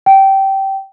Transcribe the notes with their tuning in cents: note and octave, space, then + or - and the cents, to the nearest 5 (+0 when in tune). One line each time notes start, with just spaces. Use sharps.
G5 -15